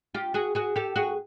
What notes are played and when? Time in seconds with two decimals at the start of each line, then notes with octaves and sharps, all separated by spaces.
0.14 F4 G4
0.34 F#4 G#4
0.55 F#4 G#4
0.76 G4 A4
0.96 F#4 G#4